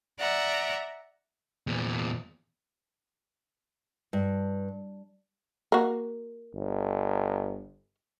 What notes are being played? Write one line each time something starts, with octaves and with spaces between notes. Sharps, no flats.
D5 E5 F#5 A#5
E2 A#2
G2
A#3 F#4
G1